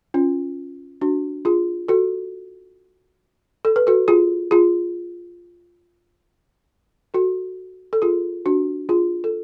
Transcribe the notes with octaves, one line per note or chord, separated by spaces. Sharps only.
C#4 F4
D4 F#4
F4 G#4
F#4 A4
A4
B4
F#4 A4
F4 G#4
F4 G#4
F#4 A4
A4
F4 G#4
D4 F#4
F4 G#4
A4